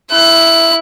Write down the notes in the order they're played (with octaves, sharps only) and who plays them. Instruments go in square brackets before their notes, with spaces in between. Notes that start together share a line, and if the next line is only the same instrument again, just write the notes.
[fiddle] E4 F#6